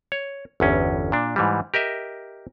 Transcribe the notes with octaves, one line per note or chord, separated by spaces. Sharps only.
C#5
G1 E2 C#4
A#2 D4
G#2 E3 G3
G4 A#4 D#5 E5